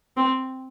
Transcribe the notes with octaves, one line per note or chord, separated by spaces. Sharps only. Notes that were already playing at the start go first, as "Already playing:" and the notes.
C4